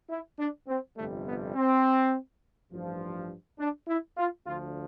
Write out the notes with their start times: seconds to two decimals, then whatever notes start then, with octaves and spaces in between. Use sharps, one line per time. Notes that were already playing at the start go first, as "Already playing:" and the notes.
0.10 E4
0.38 D4
0.68 C4
0.97 G1 F2 C3 G3 A3
1.26 B3
1.55 C4
2.72 A1 G2 F3
3.59 D4
3.88 E4
4.17 F4
4.46 D2 D3 F3 F4